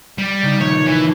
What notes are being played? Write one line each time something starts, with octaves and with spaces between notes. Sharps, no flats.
G3
C#3 D#4
A#1 D#3 B4 C#5
E3